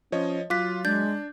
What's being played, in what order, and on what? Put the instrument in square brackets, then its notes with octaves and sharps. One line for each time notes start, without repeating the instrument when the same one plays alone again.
[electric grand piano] F3 C#5 D#5 [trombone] C#4
[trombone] F#3 [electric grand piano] F4 [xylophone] D6 F#6 B6
[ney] G#3 [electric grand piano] D4 [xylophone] G6 A6